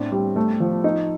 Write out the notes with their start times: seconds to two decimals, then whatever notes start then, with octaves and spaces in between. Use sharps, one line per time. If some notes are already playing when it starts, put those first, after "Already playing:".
Already playing: A2 C4 D4
0.12 G3
0.36 A3
0.60 F3
0.84 D#4